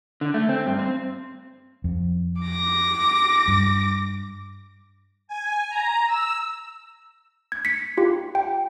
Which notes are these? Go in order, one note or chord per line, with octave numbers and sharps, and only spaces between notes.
D3
A3
C4
G2
C4
F2
D6 A#6
G2
G#5
A#5
E6
G#6
B6 C#7
F4 G4
G5